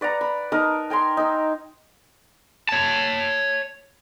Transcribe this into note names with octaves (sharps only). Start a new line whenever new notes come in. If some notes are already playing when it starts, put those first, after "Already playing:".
B4 D5 F#5 A#5
B5
D#4 A#4 A5 D#6
G5 G#5 A#5 C6
D#4 E6
C#5 A5